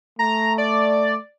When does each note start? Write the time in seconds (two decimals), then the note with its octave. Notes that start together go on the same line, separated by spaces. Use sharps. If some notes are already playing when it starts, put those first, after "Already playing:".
0.19 A3 A#5
0.58 D5